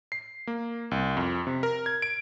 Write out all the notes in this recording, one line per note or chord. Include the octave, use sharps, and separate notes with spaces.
C7
A#3
C2
F2
C3
A#4
G#6
D7